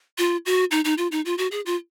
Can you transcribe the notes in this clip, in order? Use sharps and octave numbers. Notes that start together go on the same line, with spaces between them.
F4
F#4
D#4
D#4
F4
D#4
F4
F#4
G#4
F4